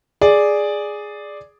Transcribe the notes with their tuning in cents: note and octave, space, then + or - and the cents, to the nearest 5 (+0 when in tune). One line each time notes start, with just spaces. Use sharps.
G#4 +0 D5 +0